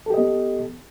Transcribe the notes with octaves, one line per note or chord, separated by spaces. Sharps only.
B3 G4 A4 D#5